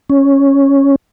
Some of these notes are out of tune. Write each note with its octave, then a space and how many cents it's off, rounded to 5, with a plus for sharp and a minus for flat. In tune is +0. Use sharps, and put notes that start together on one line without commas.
C#4 -5